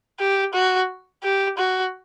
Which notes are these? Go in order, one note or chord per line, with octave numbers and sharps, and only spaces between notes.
G4
F#4
G4
F#4